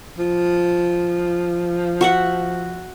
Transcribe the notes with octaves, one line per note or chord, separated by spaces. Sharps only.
F3
F#4 E5 F#5